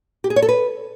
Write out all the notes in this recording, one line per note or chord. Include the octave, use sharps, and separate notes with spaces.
G4
G#4
C#5
A4
B4